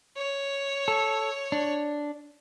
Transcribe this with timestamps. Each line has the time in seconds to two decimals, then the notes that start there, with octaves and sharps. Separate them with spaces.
0.17 C#5
0.88 A4
1.52 D4